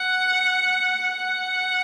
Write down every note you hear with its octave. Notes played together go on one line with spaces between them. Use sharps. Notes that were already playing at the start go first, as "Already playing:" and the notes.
Already playing: F#5
F#5